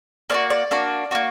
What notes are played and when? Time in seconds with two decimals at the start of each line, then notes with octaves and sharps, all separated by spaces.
0.30 A#3 D4 F#4 D5
0.50 D5
0.71 A#3 D4 F#4
1.11 D4 F#4
1.15 A#3